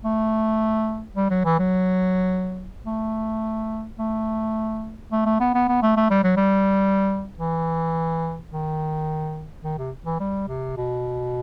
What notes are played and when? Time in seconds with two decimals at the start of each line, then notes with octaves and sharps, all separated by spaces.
0.04 A3
1.16 G3
1.30 F#3
1.45 E3
1.59 F#3
2.86 A3
3.99 A3
5.12 A3
5.26 A3
5.40 B3
5.54 B3
5.68 B3
5.82 A3
5.97 A3
6.11 G3
6.24 F#3
6.37 G3
7.38 E3
8.51 D#3
9.63 D#3
9.78 C3
10.06 E3
10.20 G3
10.48 C3
10.77 B2